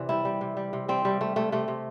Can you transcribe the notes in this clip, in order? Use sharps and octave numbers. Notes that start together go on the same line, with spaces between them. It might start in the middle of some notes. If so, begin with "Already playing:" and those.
Already playing: C3 E3 D5
G3 E4
G3
C3
G3
C3
G3 C4
C3 G3
G3 A3
C3 A3
C3 A3
C3